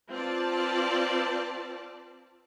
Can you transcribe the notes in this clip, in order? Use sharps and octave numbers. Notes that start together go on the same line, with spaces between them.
C4 F4 B4 D5 A5